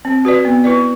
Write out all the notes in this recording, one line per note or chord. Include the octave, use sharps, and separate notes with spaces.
C4
F#4 B4 D5
B3
E4 B4 D5